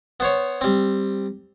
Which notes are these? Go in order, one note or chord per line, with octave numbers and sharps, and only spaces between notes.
B3 C5 C#5
G3 C4